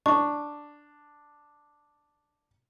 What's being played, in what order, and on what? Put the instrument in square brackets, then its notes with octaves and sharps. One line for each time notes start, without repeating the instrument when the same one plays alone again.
[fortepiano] D4 [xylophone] C#6